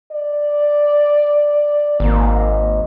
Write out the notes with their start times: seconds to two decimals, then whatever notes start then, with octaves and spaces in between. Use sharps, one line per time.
0.12 D5
2.00 G#1 A#3